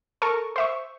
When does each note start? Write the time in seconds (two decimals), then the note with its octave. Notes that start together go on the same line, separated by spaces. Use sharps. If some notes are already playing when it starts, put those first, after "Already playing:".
0.22 A4 A#4 C#6
0.56 C5 E5 C#6